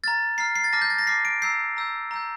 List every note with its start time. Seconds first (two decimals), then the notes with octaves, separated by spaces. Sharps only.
0.04 A#5 F6 A6
0.38 A#5 F6 C7
0.56 C7
0.64 A6
0.73 A5 D6 F6 A#6
0.82 G6
0.90 A6
0.98 A#6
1.07 A5 D6 F6 C7
1.25 D7
1.42 A#5 E6 G6 C7
1.77 A#5 E6 G6
2.11 A#5 E6 G6